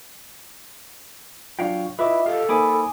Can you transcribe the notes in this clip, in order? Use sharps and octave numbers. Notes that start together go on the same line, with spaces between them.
F#3 D4 F4 C#5 F5 G5
E4 F4 B4 D#5 E5 D6
G4 A4 F5
A#3 D#4 C5 G#5 B5 D6 D#6